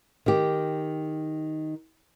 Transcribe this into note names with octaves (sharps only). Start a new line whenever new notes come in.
D#3 G4